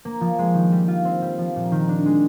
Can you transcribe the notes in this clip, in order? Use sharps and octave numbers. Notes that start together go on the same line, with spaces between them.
A#3
F3
G#3
D#3
G3
F4
C4
G3
F3
A#2
D#3
D4
G#3